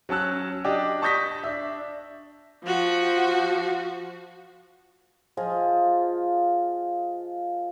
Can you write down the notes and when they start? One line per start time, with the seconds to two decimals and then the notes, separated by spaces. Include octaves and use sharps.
0.09 F#3 C#4 A5 E6 F#6
0.64 D4 G4 D5 D#5
1.02 A5 C#6 D#6 G6 A#6 B6
1.44 D4 E5
2.64 F3 F#4
5.37 F3 F4 G#4 D#5